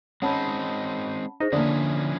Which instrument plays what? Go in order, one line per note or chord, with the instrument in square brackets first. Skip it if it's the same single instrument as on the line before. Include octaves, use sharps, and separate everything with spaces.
[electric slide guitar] G#3 C4 D#4 [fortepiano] C#4 [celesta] F#5 A5 B5
[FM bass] D#4 [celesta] G#4 C5 A#6
[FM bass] D3 [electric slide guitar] F3 C#4 E4 [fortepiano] A#3 D4 [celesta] D5 D#6